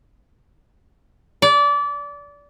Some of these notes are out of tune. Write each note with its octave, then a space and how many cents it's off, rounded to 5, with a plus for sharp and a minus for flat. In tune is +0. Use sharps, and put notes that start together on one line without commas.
D5 -25